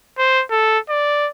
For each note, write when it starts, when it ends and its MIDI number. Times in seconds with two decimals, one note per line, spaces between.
0.18 0.44 72
0.51 0.78 69
0.89 1.29 74